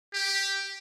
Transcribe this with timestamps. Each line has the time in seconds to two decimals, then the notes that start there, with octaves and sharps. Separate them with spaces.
0.14 G4